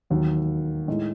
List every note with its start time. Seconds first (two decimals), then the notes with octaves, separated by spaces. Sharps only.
0.10 E1 D#2 D#3 F#3
0.88 A2 G#3 D#4